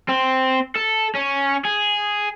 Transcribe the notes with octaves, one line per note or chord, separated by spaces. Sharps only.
C4
A4
C#4
G#4